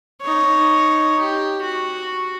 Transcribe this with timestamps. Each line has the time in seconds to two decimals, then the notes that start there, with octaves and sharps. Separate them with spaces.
0.21 D#4 C#5
1.18 G4
1.61 F#4